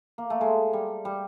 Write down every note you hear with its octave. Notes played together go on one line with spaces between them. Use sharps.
A#3
A3
G#3
G3
G3